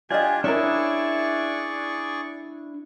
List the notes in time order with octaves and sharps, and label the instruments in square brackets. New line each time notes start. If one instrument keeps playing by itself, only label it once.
[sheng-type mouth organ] D4 F4 G4 [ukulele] D5 D#5 [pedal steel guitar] G#5
[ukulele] C#4 A#4 [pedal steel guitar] D4 E4 [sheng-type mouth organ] G#4 D5 C#6